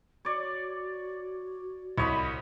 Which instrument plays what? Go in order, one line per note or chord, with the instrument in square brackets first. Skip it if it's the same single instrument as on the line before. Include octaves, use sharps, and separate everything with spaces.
[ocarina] F#4 [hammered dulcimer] C#5 D5
[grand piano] C2 [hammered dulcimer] C#5 D#5 B5